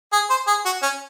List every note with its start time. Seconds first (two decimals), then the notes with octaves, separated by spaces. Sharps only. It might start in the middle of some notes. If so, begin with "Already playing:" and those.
0.13 G#4
0.30 C5
0.47 G#4
0.65 F#4
0.82 C#4